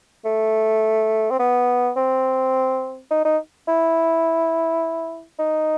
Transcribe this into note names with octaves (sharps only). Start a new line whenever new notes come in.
A3
C4
B3
C4
D#4
D#4
E4
D#4